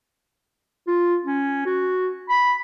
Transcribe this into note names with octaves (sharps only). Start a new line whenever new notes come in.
F4
C#4
F#4
B5